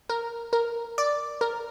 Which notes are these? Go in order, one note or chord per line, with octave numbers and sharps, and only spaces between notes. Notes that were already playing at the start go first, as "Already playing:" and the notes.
A#4
A#4
D5
A#4